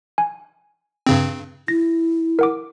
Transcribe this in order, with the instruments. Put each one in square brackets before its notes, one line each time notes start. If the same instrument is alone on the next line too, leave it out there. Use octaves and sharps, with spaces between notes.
[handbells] G#5
[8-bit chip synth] G2 C#3 C4
[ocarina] E4 [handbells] A#6
[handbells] A#4 F#5 D6